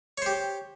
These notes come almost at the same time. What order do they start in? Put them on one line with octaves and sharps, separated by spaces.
C#5 C5 G4